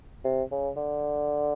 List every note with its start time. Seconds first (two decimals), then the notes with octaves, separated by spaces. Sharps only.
0.25 C3
0.51 C#3
0.76 D3